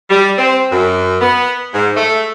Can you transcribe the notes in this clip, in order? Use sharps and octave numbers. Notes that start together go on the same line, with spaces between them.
G3
C4
F#2
B3
G#2
A3